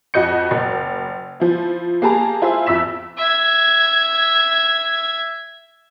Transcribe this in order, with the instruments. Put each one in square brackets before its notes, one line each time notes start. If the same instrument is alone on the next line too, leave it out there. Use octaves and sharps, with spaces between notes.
[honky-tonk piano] F2 F#4 D#5 G6 C#7
F#1
F3 E4
A#3 G4 G#4 A5 A#5
E4 F4 G#4 C5 E5
F2 E5 E6 B6 E7
[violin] E5 G#6